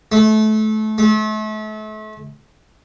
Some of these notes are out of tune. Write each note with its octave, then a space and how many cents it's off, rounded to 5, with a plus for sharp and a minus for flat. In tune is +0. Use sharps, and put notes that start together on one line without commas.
A3 -25
A3 -35